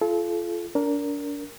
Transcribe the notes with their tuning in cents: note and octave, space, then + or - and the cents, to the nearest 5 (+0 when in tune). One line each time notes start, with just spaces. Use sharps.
F4 -25 A4 -35
D4 -30 A#4 +0